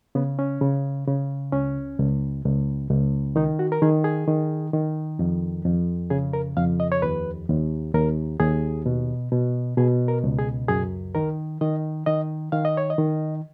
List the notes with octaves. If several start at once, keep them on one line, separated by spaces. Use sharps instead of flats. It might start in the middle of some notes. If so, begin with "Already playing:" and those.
C#3 B3
C#4
C#3
C#3
C#2 C#4
C#2
C#2
C#2
D#3 D#4
F#4
A#4
D#3 G#4
G#4
D#3
D#3
F2
F2
C#3 G#4
A#4
F2 F5
D#5
C#5
D#2 B4
D#2
D#2 A#4
D#2 G#4
B2
B2
B2 G#4
A#4
C#2
G#4
F#2 G#4
D#3 A#4
D#3 D#5
D#3 D#5
D#3 F5
D#5
C#5
D#5
D#3